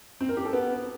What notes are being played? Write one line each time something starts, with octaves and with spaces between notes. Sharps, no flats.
C4
A#4
G4
A4
B3